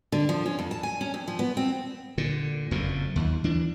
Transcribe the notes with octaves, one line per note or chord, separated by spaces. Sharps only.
D3
F3
C#4
F2
A5
G#5
C#4
F2
F3
B3
C4
A#2 D3
F#1 F2 A#2
D#2
E3 D4